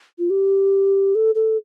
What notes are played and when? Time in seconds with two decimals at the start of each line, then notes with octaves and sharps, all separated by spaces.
0.19 F4
0.30 G4
1.15 A4
1.35 A4